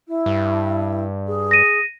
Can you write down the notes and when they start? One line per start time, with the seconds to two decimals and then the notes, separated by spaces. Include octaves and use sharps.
0.08 E4
0.26 G2
1.27 G#4
1.51 A#6 D#7